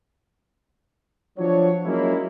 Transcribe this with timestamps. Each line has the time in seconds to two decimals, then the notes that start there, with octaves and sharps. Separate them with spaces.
1.37 F3 F#3 D4 F#4 C#5
1.85 F#3 G#3 A#3 C#4 E4